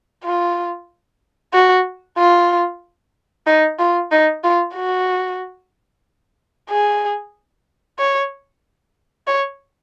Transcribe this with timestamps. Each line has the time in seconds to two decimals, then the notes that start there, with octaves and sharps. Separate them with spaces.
0.25 F4
1.53 F#4
2.18 F4
3.47 D#4
3.79 F4
4.12 D#4
4.44 F4
4.76 F#4
6.70 G#4
7.99 C#5
9.27 C#5